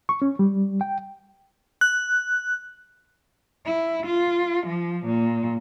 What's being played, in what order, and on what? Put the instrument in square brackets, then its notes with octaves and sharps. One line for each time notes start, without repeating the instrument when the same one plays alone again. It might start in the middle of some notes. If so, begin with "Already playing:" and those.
[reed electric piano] C#6
C#4
G3
G5
[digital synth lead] F#6
[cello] E4
F4
F3
A#2